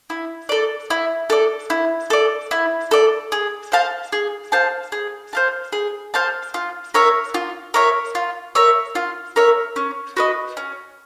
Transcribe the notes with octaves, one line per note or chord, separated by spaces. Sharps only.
E4
A4 D5
E4
A4 D5
E4
A4 D5
E4
A4 D5
G#4
C5 F5 A5
G#4
C5 F5 A5
G#4
C5 F5 A5
G#4
C5 F5 A5
F4
A#4 C#5 E5
F4
A#4 C#5 E5
F4
A#4 C#5 E5
F4
A#4 C#5 E5
C#4
F#4 B4 D#5
C#4